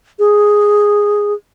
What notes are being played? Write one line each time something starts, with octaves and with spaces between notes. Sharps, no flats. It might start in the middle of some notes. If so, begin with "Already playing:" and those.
G#4